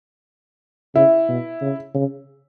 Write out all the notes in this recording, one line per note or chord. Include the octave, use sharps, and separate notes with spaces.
C#3 E4
B2
C#3
C#3